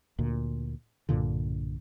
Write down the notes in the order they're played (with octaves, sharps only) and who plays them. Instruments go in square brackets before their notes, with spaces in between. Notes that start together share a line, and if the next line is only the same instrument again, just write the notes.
[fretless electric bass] D2 A#2
B1 G2 A#2 D3